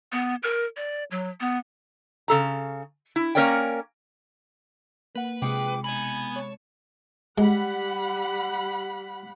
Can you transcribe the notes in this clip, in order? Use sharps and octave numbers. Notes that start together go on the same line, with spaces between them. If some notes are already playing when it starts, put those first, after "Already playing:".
B3
A#4
D5
F#3
B3
C#3 A4 A#5
E4
A#3 C#4 A#4 C#5 D5 G5
A#3 B4 F#5
C3 F3 G#3 G#4 G5 D6 C#7
B2 B3 D#4 G#5 B5
C#5 A5
G3 G#3 F#5 B5